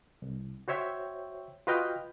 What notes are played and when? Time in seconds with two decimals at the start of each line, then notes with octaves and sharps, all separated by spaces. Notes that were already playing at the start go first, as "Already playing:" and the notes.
0.22 C2
0.68 F#4 C5 C#5 E5 G5
1.67 F4 F#4 B4 D#5 G5 F6